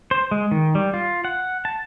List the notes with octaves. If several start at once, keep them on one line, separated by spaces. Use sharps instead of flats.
C5
G#3
D#3
G3
F4
F#5
A5